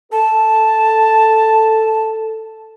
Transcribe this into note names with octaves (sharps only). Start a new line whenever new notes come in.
A4 A5